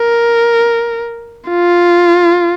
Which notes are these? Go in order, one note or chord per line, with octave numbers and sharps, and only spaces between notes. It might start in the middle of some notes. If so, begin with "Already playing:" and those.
Already playing: A#4
F4